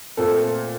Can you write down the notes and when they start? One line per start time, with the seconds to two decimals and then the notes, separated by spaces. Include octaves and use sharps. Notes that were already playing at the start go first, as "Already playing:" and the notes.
0.17 A#2 A3 C4 A4